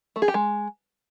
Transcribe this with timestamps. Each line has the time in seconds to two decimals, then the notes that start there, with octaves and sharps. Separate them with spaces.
0.16 A3
0.22 G#4
0.28 G4
0.34 G#3